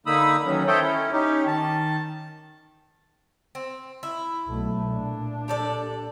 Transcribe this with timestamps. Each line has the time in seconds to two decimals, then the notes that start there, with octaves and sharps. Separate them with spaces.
0.06 D3 A#3 D#4 B5 D#6 E6
0.45 D#3 E3 F#3 C#4
0.67 A4 C5 C#5 D#5 E5 G5
0.82 C#4 E4
1.12 C#4 D#4 G4
1.47 D#3 A5
3.55 C4
4.03 E4
4.48 B1 A3
4.91 A#2 D4
5.48 G4 A4 D5